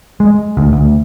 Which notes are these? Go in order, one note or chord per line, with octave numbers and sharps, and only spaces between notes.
G#3
D2
D2